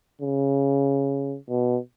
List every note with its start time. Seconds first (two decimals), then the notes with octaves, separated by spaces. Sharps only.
0.22 C#3
1.49 B2